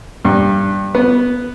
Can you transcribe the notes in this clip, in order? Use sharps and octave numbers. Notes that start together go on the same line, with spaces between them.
G2
B3